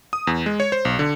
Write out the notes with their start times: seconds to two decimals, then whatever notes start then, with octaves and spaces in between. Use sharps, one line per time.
0.13 D#6
0.27 E2
0.46 G#3
0.60 C#5
0.72 C5
0.85 B1
0.99 D3